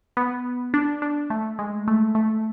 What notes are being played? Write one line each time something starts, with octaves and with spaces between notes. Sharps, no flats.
B3
D4
D4
A3
G#3
A3
A3